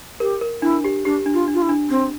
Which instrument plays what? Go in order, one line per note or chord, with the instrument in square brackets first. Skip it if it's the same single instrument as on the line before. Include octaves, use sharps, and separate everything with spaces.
[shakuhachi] G4 [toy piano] A#4
[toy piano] A#4
[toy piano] D4 [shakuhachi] E4
[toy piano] G4
[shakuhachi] D4 [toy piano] G4
[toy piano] D4
[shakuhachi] F4
[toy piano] D4
[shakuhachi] F4
E4
[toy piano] D4
[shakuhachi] C4 [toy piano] D4